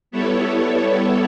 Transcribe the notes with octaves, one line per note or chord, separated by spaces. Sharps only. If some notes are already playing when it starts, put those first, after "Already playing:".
G3 B3 E4 A4 C#5